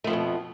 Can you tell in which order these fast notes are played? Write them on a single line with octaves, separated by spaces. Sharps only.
A3 F3 F2 B2